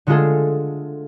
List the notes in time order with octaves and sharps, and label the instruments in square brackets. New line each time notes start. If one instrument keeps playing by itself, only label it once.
[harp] D3 G#3 A3 F4 G#4 A4